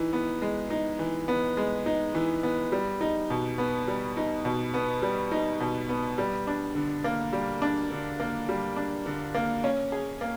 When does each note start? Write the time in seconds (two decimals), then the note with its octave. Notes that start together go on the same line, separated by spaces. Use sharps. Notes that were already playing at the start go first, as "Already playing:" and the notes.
Already playing: E3 D#4
0.13 B3
0.42 G#3
0.70 D#4
0.99 E3
1.28 B3
1.57 G#3
1.86 D#4
2.15 E3
2.43 B3
2.72 G3
3.01 D#4
3.30 B2
3.58 B3
3.88 G3
4.17 D#4
4.45 B2
4.74 B3
5.02 G3
5.32 D#4
5.60 B2
5.89 B3
6.18 G3
6.47 D4
6.75 D3
7.04 A#3
7.33 G3
7.62 D4
7.91 D3
8.20 A#3
8.49 G3
8.76 D4
9.06 D3
9.35 A#3
9.64 C#4
9.92 G#4
10.21 A#3